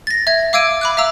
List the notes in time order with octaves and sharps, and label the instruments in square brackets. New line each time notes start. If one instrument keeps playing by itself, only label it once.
[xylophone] A6 A#6
E5 G#6
F5 D6 E6 G#6 D7 D#7
B5 D6 F#6
E5 F5 A#5 E6